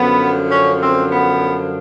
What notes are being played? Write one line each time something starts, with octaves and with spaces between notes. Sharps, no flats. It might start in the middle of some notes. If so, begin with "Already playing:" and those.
Already playing: F#2 D3 F3 B3
C#4
C4
B3